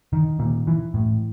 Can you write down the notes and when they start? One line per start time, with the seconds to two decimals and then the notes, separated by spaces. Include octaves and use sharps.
0.13 D#3
0.39 A#2 D#3
0.67 E3
0.94 A2